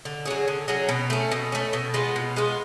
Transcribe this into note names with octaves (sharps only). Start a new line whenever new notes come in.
D3
F#3 C#4 G#4
D3
F#3 C#4 G#4
B2
A3 C#4
B2
A3 C#4
B2
G#3 B3 F4
B2
G#3 B3 F4